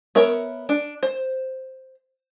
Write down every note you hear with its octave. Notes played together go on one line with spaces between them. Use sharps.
B3 A#4 C#5 E5
D4
C5